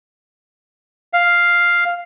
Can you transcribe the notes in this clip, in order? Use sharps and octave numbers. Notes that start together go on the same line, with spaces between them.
F5